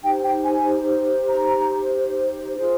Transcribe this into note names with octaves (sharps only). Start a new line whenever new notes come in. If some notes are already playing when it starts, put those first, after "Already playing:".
D#4 G4 C5 G5
G5
G#5
A#5
F4 G#4 C5